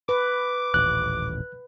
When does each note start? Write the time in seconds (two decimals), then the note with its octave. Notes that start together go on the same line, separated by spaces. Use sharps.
0.09 B4 D6
0.74 D#1 A1 F#6